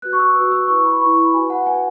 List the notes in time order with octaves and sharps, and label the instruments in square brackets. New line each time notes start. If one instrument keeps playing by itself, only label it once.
[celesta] F#4 B4 F#6
C#6
E6
F#4 B4
E6
E4 B4 C#6
B5
E4 B4 C#6
B5
F#4 B4 G#5
F#5
F#4 B4 G#5